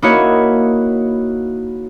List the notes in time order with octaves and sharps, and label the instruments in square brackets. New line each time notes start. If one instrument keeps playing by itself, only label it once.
[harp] A#3 D#4 E4 F#4 C#5